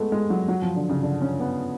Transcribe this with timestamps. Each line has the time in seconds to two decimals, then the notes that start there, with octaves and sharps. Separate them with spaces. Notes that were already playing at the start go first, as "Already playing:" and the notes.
Already playing: G#3 A3 B3
0.12 G#3
0.30 F#3
0.48 F#3
0.62 F3
0.76 D3
0.89 C#3
1.03 D3
1.21 C#4
1.40 B3